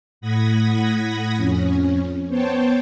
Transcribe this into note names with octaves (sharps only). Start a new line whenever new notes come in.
A2 F#5 B5 D#6 G#6 A#6
F2 C#4
B3 C5 C#5 G5 A5